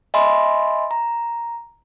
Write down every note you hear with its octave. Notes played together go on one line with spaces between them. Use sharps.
D#5 E5 G#5 B5 C6
A#5